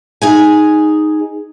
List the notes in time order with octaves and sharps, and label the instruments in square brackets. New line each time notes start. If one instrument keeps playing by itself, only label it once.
[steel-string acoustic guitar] D#4 G#4 G#5